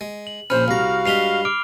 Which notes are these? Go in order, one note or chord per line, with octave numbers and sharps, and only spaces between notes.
G#3
F#7
A#1 C#4 C5 B5 F6
C2 F#4 F5 A#5
G2 G#3 B5 C7 F7 G7
D6 F6 D7